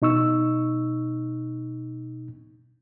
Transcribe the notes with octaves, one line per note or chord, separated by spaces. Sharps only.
B2 D#4 C#6 E6